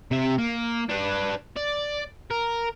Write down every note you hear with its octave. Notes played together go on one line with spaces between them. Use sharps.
C3 E5
A#3
D4 B4
D5
A#4